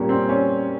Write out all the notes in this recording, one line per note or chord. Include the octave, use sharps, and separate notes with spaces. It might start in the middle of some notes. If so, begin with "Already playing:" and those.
Already playing: A#2 G3 A#3 C#4
C4
C#4